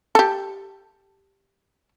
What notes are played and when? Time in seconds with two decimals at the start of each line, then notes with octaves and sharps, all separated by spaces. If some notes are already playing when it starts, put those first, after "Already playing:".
0.15 G4 A4